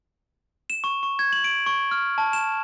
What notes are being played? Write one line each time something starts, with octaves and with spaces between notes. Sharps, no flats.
E7
C#6
C#6
G#6
F#7
D7
C#6
F6
A5
E7